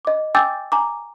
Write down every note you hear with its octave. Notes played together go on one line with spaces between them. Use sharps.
D#5 D6
G5 G#5 D6 E6 G6 A6
G#5 A#5 D6